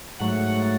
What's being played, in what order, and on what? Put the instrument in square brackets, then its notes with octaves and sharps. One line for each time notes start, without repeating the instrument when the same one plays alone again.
[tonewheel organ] G#2 F#3 A3 F#5